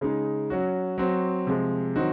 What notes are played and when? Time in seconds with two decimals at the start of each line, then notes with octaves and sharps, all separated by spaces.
0.01 C#3 G#3 D#4
0.50 F#3 C#4 F#4
0.98 F#3 C4 F#4
1.47 C3 F3 G#3
1.96 D#3 F#3 C4 D#4 F#4